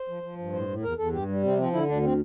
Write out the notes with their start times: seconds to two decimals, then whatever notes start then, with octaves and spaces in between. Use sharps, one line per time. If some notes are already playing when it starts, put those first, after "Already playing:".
Already playing: C5
0.08 F3
0.23 F3
0.38 G2
0.53 A2 C5
0.68 A2
0.83 E2 A#4
0.98 E2 A4
1.13 G2 G4
1.28 G3
1.43 C3 C4
1.58 F3 C4
1.73 D3 E4
1.88 D2 D4
2.03 C4